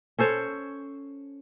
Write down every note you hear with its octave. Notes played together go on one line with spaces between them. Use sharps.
C#4 A4 C5 C#5